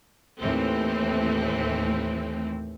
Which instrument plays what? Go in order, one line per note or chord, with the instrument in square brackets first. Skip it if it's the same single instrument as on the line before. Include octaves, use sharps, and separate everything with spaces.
[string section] D#2 A2 E3 C4